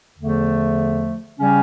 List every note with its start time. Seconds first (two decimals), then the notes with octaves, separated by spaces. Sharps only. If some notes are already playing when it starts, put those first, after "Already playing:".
0.18 E2 D3 F3 A3
1.40 C#3 G3 C#4